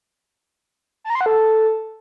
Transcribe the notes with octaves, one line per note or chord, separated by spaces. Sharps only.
A5
A#5
C6
F#5
A4